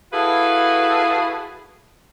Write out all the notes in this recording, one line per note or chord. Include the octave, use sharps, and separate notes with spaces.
E4 F#4 G#4 A4 B4 F5